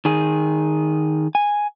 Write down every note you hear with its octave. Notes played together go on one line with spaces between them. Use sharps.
D#3 G#4
G#5